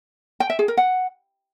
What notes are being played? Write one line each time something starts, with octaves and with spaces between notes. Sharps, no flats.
G5
E5
G#4
A#4
F#5